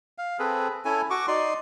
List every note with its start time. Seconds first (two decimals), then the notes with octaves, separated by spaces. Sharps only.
0.18 F5
0.39 C4 G#4 A4 B4
0.85 C#4 E4 A4 G#5
1.10 F#4 C#6 D6
1.28 D#4 D5 C6